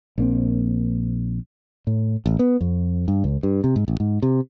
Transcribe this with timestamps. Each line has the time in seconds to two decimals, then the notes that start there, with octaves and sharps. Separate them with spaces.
0.18 A#1 A#3 C4
1.87 A2
2.26 A1
2.39 B3
2.61 F2
3.08 G2
3.24 C#2
3.43 G2
3.64 C3
3.76 G#2
3.88 A1
4.00 G#2
4.23 C3